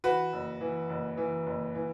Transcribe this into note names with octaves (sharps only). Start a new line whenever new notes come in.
E3 F#4 B4
F#1
E3
F#1
E3
F#1
E3